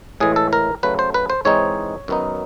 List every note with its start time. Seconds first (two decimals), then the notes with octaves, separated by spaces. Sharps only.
0.20 A2 E3 G#3 G#4
0.36 A4
0.53 A#4
0.83 C#3 F#3 A3 B4
0.99 C5
1.14 B4
1.30 C5
1.45 G#2 E3 G#3 C4 D#4 C#5
2.08 F#2 D#3 F#3 B3 D#4